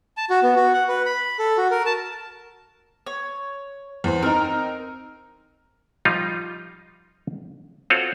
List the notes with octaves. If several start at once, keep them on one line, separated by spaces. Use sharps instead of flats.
A5
F#4
B3
F#4
F#5
B4
B5
A4
F#4
A#4
A5
C#5
E2 C5
C4 D#4 A#4
F3 G3 D#4 F4
C4 F4 F#4 A4 C#5